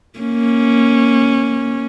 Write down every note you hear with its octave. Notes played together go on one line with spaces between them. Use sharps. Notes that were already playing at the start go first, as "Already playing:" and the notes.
A#3 C#4